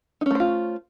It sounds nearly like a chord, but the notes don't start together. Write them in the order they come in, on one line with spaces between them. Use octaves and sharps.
D#4 C#4 A3 C5 F4